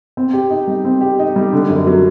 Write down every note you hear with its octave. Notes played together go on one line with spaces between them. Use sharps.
C4
G4
D#4
G3
C4
G4
D#4
G3
D3
F#2
F#3